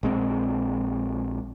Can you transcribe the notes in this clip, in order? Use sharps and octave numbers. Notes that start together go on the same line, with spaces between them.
A#1 G#3 C4